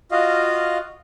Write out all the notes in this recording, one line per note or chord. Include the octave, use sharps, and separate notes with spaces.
F4 F#4 D#5 F5